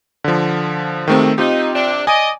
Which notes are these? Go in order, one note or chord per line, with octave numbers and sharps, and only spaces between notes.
D3 F3
G#2 C3 D#3 A3 C4
C4 D#4 F4 G4
C3 D4
D5 D#5 G#5